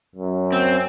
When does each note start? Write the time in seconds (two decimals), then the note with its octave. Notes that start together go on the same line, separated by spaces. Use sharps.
0.15 F#2
0.52 C4